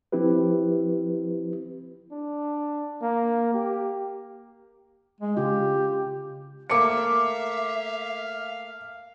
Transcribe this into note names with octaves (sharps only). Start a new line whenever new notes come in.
F3 C4 E4 G4 B4
D4
A#3
G4
G#3
C#3 F4 G4
A3 A#3 E5 F5 D6 C#7